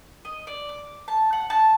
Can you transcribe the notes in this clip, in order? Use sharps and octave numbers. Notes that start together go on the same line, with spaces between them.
D#5
D5
D6
A5
F#5
A5